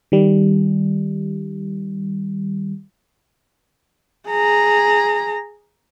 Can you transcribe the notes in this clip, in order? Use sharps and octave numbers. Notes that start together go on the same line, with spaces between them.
D#3 G3
G#4 A#5